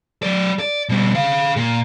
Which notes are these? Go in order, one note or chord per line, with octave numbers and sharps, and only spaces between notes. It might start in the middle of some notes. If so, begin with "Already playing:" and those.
F#3 D5
D5
B2 G3
G#4 F5
A#2